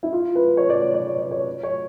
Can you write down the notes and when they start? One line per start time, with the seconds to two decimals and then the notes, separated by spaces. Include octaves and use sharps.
0.03 E4
0.13 F4
0.35 B4
0.57 C#5
0.69 D5
0.82 C#5
0.94 D5
1.07 C#5
1.19 D5
1.31 C#5
1.63 C#5